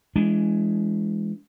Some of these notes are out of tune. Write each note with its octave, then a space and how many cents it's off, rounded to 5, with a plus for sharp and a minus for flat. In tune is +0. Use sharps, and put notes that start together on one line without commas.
E3 +20 G#3 +0 D4 -25